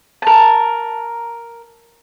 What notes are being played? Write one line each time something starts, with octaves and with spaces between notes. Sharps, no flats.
A#4 A5